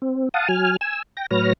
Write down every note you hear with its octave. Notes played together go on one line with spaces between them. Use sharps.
C4
F5 F#5 A5 D#6
F#3 G#5 F6
G#5 E6
G5 A#6
A2 F#3 B4 C#5 F6 A#6